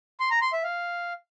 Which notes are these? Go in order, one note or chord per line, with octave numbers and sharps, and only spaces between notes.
C6
A#5
C6
E5
F5